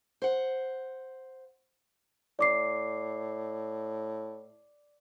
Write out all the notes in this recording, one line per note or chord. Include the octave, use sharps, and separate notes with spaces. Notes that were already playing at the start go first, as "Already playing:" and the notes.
C5 F#5
A2 D5 D6 C7